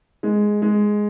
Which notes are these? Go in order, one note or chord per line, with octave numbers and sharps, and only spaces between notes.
G#3
G#3